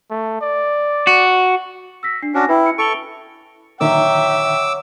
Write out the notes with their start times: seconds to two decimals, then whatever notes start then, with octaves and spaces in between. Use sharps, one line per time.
0.10 A3
0.41 D5
1.07 F#4
2.03 E6 A#6 B6
2.22 D4 C7
2.35 C#4 D4 F#4 G#5 A#6
2.49 E4 B4 G5
2.66 C#7
2.78 A4 C#6 D7 F7 G7
3.81 A#2 D3 D#3 F#3 E5 G5 D6 E6